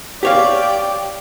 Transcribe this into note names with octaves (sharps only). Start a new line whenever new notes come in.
G4 C#5 D5 F5 G5